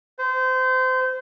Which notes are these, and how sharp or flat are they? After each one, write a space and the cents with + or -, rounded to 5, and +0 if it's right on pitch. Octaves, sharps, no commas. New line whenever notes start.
C5 -25